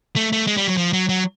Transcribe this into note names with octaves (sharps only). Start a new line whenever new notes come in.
A3
A3
G#3
G3
F#3
F3
F#3
F#3